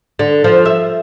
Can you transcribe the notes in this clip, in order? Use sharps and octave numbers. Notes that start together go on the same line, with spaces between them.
D3
F3
E5